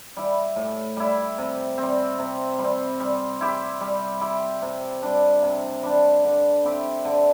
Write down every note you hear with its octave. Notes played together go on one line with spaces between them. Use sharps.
G3 E4
A2
G3 E4
C3
G3 C4
C3
G3
C4
G3
E4 G4
G3
E4 G4
C3
G3 D4
C3
G3 D4
D3
C4 E4 G4
D3